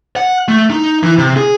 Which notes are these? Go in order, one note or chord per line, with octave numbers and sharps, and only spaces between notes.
F#5
A3
D#4
E3
C3
G#4